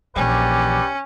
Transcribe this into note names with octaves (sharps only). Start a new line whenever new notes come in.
A#1 E3 C#4 G4 B4 D5